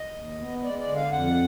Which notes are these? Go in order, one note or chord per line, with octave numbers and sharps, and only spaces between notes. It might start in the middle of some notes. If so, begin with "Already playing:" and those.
Already playing: D#5
D#2
B3
G#3 D5
D5
D3
F5
F2 F#5